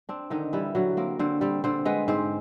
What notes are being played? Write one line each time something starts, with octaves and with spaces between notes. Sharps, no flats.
C4 D4
D3 D#3 D#4
E3 G3 E4
D3 F#3 F#4
A#3 C4 A#4
D3 C4 C5
G3 C4 C5
D3 C4 C5
G#3 B3 B4
G#2 C4 C5